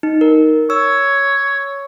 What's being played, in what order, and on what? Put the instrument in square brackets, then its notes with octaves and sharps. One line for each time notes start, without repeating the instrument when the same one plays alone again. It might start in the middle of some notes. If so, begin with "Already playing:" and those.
[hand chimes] D#4
A#4
[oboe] C#5 [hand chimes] E6